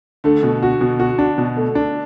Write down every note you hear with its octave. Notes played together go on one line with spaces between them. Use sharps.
D3 A3
B2
F#4
B2
F#4
D4
B2
A3
D4